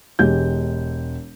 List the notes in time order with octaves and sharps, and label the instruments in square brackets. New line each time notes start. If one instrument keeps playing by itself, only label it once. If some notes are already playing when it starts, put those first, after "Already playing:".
[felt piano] E1 G#3 G4 G6